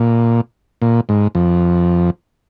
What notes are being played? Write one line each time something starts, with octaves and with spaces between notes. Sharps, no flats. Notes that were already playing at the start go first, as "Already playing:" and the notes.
Already playing: A#2
A#2
G#2
F2